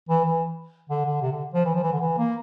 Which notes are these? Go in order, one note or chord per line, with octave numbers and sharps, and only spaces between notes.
E3
E3
D3
D3
C3
D3
F3
E3
F3
E3
D3
E3
A#3